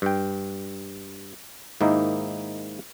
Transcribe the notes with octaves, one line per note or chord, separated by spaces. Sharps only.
G2 G5
G#2 D#3 A#3 D#4 E4